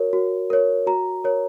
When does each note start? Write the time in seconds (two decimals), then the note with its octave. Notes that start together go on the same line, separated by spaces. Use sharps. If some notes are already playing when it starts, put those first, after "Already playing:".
Already playing: F#4 A#4 C#5
0.13 F#4
0.50 A#4 C#5
0.87 F#4 A#5
1.24 A#4 C#5